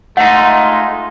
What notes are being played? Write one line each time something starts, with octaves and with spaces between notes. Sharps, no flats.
G#3 A3 D#4 F4 F#5